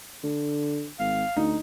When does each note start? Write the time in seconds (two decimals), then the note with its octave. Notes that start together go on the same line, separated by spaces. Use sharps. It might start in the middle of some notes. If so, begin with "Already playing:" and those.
0.23 D3
0.99 G#1 F5
1.37 D2 D#4